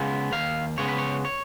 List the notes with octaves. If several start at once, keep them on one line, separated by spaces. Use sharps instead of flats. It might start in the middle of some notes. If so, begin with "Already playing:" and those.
Already playing: C#3 G#3 B3
D#2 F5
C#3 G#3 B3 C#5
B4
C#5
C#5